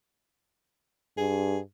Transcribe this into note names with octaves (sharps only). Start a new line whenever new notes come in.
G2 G#4